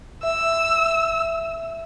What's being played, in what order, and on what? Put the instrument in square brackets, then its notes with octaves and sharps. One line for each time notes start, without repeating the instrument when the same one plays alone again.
[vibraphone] E5 [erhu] E6